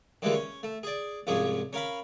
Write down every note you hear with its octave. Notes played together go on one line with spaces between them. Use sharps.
D3 E3 G3 G#3 A#3 F4
C#4
A3
G#4 D5
C2 G#2 F3 C#4 G#4
C#4 A#4 F5 B5